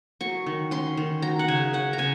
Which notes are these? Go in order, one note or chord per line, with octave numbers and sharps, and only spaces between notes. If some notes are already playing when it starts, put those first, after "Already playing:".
F#3 C#6
D#3
C#4 C6
D#3
F#3 A#5
F#5
C#3 G#5
C#4 F#5
A#5
C#3 G#5